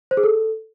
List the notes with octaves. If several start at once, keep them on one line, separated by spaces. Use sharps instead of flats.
C5
G#4
A4